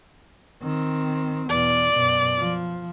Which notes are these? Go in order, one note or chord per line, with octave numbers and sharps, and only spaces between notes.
D#3 C4
E2 B2 D5
F#2 B2
F3